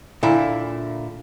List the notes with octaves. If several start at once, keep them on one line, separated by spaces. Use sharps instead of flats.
A#2 D3 E4